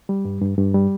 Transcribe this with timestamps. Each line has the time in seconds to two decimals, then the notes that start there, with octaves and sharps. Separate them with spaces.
0.09 G3
0.25 G2
0.41 G2
0.58 G2
0.74 G3